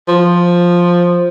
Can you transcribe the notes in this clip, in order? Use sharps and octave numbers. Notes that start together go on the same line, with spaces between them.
F3